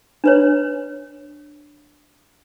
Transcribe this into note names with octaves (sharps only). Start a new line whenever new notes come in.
D4 B4 C#5